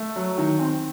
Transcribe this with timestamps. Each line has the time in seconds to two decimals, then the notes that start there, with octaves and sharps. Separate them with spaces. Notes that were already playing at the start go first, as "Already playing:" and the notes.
Already playing: A3
0.16 F#3
0.38 D#3
0.59 C4